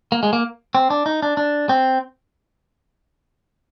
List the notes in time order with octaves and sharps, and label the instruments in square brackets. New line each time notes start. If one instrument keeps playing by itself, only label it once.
[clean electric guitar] A#3
G#3
A#3
C4
D4
D#4
D4
D4
C4